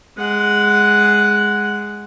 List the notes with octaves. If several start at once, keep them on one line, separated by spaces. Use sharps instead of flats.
G#3 F#5